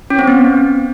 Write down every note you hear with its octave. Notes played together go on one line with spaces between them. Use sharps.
C#4
C4
B3